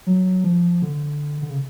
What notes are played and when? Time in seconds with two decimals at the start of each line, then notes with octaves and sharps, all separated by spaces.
0.07 F#3
0.44 F3
0.82 D3
1.42 D3
1.50 C#3